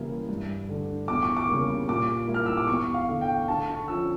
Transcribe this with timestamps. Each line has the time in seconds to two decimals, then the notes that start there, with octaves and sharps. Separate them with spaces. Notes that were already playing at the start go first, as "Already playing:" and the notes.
Already playing: C#3 E3 G3 A#3 E4
0.29 G2
0.69 D3 A3 D4
1.08 E2 D6
1.23 C#6
1.37 D6
1.49 C#3 G3 A#3
1.89 A#2 D6
2.28 G3 A#3 E4
2.34 F6
2.46 E6
2.57 D6
2.68 E2 C#6
2.94 F5
3.08 D3 A3 D4
3.21 G5
3.48 D3 A5
3.68 C#6
3.88 F3 C#4 F4 E6